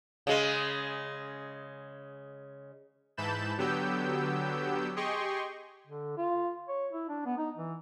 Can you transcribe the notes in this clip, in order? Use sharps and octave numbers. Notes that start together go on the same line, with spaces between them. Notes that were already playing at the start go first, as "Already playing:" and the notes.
C#3 G#3
G#2 E3 A5 B5 G6 E7
D3 F#3 B3 G4 E6 G6
G4 G#4 D#5 G5 C6 C#6
D3
F4
C#5
E4
D4
B3
D#4
E3